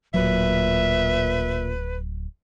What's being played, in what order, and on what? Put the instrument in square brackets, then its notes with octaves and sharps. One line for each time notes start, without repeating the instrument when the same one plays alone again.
[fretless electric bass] D1 F#3 [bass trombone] A#2 [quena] B4 [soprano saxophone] E5